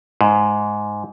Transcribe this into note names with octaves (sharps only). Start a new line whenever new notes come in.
G#2